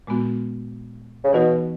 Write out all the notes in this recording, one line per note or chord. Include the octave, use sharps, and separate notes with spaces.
A#2 G#3 B3 F#4
C#3
B2 E3 B3 D#4 F#4